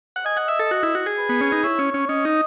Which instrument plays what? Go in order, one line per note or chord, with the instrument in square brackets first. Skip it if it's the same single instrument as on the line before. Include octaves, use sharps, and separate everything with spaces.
[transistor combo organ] F#5
[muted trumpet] D#5 [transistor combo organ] G#5
[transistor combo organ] F#5
E5
A4
F#4
E4
F#4
G#4
[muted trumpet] B4
[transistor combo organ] B3
C#4
D#4
[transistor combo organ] E4 [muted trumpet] C#5
[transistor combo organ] C#4
C#4
[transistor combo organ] C#4 [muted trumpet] D#5
[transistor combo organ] D#4